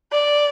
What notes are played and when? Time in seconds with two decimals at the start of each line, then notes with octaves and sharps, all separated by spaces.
0.12 D5